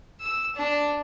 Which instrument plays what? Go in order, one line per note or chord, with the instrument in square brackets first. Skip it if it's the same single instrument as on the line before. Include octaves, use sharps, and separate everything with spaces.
[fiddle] E6
D4